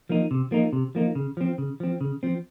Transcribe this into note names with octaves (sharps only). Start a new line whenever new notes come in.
F3 A#3 D#4
C3
F3 A#3 D#4
C3
F3 A#3 D#4
C#3
F3 C4
C#3
F3 C4
C#3
F3 C4